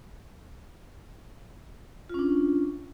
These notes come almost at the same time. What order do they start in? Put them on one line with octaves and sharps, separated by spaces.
F4 C#4 D4